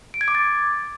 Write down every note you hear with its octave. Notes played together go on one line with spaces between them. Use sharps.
D7
G#6
D6
A6